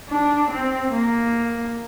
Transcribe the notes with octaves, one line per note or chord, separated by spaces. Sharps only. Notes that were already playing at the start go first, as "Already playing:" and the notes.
D4
C4
A#3